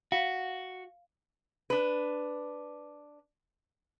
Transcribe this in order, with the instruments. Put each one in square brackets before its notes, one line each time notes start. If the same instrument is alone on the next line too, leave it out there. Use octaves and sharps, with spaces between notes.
[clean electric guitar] F#4 [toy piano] F5
[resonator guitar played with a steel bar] D4 B4